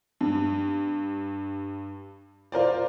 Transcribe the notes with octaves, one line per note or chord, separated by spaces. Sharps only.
G2
F4 A#4 C5 D5